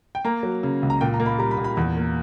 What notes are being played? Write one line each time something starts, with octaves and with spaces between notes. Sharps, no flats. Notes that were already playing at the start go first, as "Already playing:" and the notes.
G5
A#3 A#5
F#3
C#3
C#2
A#5
A#2 G5
A#5
A#3
B5
G3 A#5
B5
A#2
B5
E2
A#3